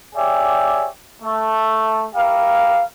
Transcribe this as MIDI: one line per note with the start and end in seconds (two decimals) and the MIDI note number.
0.15 0.88 67
0.15 0.88 68
0.15 0.88 73
0.15 0.88 74
0.15 0.88 76
0.15 0.88 79
1.23 2.06 57
2.15 2.83 64
2.15 2.83 67
2.15 2.83 70
2.15 2.83 77